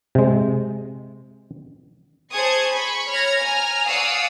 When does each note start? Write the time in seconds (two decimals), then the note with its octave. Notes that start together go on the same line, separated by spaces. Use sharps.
0.15 C3 G#3
2.32 G#4 C5 A5 C#6 D#6 G#6
2.73 B5 C#6
3.09 C#5 F6 G#6 A#6
3.40 G#5 A#5 F6
3.87 D5 F5 F#5 C#6 D#6 E6